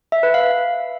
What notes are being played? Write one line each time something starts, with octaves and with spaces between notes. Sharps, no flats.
E5
B4
F5